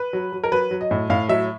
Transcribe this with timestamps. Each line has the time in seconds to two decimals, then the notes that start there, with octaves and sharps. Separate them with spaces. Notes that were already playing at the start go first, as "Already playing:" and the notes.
Already playing: B4
0.13 F#3
0.32 F#3
0.44 A#4
0.52 F#3 B4
0.71 F#3
0.81 D#5
0.91 A2
1.10 A2 F5
1.29 F#3 E5